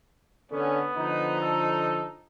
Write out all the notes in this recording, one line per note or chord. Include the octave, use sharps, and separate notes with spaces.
D3 B3 C#4
D3 F3 D#4
A4